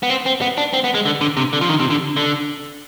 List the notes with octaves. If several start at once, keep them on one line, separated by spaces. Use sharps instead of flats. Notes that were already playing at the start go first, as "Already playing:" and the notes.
B3
C4
C4
B3
D4
C4
B3
G#3
D3
D3
C3
D3
F3
D#3
C3
D3
D3